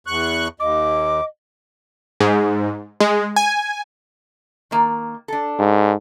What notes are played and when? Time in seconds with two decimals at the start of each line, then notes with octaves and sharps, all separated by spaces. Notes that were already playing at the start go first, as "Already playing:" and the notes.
0.07 E2 C#6 F#6
0.60 D#2 D#5 D6
2.20 G#2
3.00 G#3
3.36 G#5
4.71 D#3 A#3
5.28 D4 A4
5.59 G#2